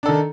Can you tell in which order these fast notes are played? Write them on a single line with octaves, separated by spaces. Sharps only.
D4 A4 D#3